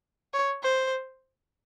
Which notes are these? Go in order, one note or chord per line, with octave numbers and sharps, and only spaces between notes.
C#5
C5